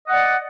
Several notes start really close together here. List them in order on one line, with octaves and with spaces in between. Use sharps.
D#5 F#5 D5